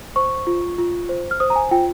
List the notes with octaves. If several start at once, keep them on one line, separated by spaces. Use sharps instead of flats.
C5 C#6
F4
F4
C5
F6
C5 D#6
A#5
G#5
F4 G5